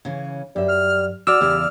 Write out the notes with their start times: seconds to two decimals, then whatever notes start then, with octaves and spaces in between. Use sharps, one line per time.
0.05 C#3 E3 C#4
0.56 F#2 G3 E5
0.68 F6
1.27 F#4 G#4 D5 D6 E6 F6
1.41 E2 C#3 E3 G3